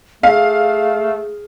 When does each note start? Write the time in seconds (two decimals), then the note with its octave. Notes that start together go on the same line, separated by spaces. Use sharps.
0.23 A3 G#4 F5